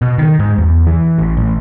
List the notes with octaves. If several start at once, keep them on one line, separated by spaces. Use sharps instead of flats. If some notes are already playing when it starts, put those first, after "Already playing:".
B2
D#3
G#2
E2
E3
A1
A1